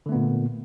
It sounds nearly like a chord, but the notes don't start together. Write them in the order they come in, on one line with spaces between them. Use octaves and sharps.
D3 A3 B3 A#2